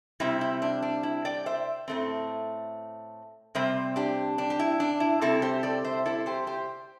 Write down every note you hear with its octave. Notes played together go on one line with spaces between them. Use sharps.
C3 G3 C4 E4
E4
D4
D4
E4
D5 G5
C5 E5
A2 A3 C4
C3 G3 C4 C5 E5
D4 G4
D4
G4
E4
D4
E4
C3 G3 C4 E4 A4
G4 C5
A4 D5
C5 E5
E4 A4
G4 C5
G4 C5